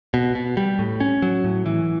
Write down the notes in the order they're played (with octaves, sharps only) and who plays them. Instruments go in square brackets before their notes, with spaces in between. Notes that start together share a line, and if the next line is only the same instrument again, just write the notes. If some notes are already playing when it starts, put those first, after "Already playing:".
[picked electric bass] B2
B2
G3
A2
C#4
F#3
A2
E3